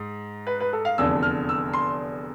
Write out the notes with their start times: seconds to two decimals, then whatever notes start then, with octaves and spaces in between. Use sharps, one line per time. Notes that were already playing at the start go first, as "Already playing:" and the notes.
Already playing: G#2
0.47 B4
0.60 B4
0.73 A4
0.85 F5
0.98 F1 E2 D3 F3 E6
1.23 F6
1.49 E6
1.73 C6